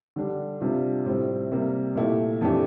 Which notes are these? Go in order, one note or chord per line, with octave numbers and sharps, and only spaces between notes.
D3 G3 D4 G4
C3 G3 D4 F4
A2 G3 C4
C3 G3 A#3
A#2 A3 E4 G4
F2 E3 A3 D4 G4